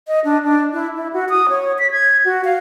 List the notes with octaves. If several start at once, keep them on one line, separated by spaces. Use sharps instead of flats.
D#5
D4
D4
E4
E4
F#4
D#6
C#5
B6
G#6
F#4
F5